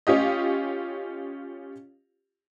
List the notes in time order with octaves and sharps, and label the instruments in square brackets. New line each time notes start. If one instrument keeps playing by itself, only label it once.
[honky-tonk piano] C#4 F4 G4 D#5